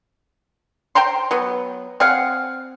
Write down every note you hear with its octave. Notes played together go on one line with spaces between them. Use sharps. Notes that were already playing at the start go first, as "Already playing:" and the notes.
C5 G5 A#5 C6
F#3 B3
C4 G#4 F5 F#5